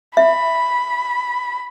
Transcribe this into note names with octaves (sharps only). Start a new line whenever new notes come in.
E5 B5